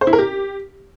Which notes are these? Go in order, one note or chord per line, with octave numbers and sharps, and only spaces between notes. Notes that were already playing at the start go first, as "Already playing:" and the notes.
C5
E4
A#4
G4